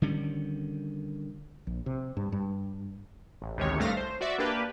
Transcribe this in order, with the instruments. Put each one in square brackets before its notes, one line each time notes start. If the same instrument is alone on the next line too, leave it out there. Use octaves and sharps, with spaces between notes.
[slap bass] D3 D#3 G3 C#4
[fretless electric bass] A#1
C3
G2
G2
[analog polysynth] A1
A1 D2 C3 D#3 G#3 C#5
C2 G2 A3 F5 A#6
C5
F#4 D5 E5
A#3 D4 G4 B4